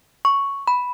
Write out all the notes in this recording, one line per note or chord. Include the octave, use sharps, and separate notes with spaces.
C#6
B5